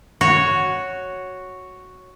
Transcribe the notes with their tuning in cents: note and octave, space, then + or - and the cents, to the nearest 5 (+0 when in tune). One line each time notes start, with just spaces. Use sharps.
F#4 +0 C#5 +0